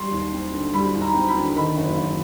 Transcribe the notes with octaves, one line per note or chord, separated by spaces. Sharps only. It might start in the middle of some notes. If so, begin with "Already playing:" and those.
Already playing: G3 C6
D#2
C4
D3
G3 B5
D#2
A#5
C4
B5
D3
D#3 B5
F#1
F#1